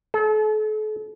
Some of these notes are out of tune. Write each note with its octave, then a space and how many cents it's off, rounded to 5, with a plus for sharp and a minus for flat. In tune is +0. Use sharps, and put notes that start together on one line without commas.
A4 -40